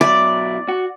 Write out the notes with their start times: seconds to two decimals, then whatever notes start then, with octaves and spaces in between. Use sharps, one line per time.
0.01 B2 F#3 E4 D5
0.68 F#4